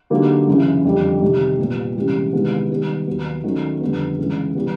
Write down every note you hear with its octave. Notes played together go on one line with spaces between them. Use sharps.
D3 F#3 A#3 D#4 G4
F#2 C#3 E3
F2 D3 G3
C3 D#3 G3
A#2 G3 B3
C#2 C3 E3 G3
C3 D#3 G#3 B3 E4
D#3 G3 B3
D#2 D#3 F#3 B3
D#3 F#3 A3 C#4
F2 D3 G3 B3
C#2 C#3 E3
C3 E3 G3 B3